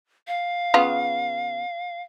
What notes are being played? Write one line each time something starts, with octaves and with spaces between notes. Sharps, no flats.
F5
C#3 B3 F4